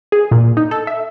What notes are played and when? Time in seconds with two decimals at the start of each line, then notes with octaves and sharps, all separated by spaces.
0.12 G#4
0.31 A#2
0.57 D#4
0.71 A4
0.87 E5